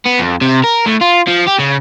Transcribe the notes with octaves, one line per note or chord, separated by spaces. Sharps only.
B3
F2
C3
A#4
A2
F4
F3
G4
C#3